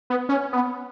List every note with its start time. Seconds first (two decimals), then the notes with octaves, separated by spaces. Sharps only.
0.10 B3
0.29 C#4
0.53 B3